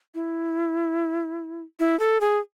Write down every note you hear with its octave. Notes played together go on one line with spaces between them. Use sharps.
E4
E4
A4
G#4